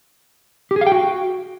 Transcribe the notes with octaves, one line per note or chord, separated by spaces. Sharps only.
G4
G#4
F5
G5
F#4